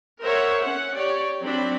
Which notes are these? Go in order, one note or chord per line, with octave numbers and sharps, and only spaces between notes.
A#4 C5 C#5 E5 F#5
C#4 F#5
G4 C#5 D5
F#3 C4 D4 B5